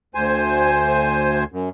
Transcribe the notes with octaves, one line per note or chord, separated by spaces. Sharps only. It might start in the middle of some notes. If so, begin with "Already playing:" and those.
D2 C5 G#5
F#2